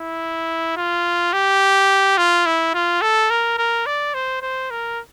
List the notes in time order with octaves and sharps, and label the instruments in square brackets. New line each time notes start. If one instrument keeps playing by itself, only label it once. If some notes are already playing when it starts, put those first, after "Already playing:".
Already playing: [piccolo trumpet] E4
F4
G4
F4
E4
F4
A4
A#4
A#4
D5
C5
C5
A#4